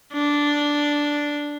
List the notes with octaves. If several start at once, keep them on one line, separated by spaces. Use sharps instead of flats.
D4